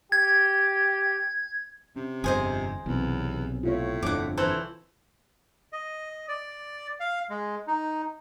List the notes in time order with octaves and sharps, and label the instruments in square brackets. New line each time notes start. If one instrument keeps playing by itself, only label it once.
[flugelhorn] G4 [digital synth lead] G#6
[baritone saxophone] C3 [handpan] C#4
[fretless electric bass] G1 F2 [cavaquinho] G#4 C5 D#5
[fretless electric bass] B1 [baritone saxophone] E2 [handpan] C3 C4
[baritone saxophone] A2 [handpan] F4 C#5
[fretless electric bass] G1 F2 D3 [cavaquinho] F#5 D6
[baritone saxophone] E3 [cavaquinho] A4 C5 C#5
[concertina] D#5
D5
F5
G#3
D#4